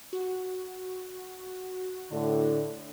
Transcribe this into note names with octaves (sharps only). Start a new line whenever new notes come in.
F#4
A2 D3